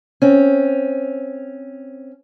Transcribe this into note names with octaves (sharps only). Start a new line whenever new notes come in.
C4 C#4